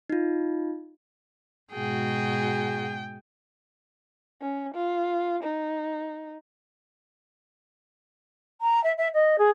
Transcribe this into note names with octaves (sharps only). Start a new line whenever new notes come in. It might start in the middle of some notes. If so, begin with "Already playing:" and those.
D#4 F4
G#2 B2 F#4 G#4 G5
C#4
F4
D#4
A#5
E5
E5
D#5
G#4